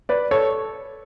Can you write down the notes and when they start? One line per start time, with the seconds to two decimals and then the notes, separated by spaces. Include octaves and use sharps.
0.09 B4 D5
0.31 A4 C#5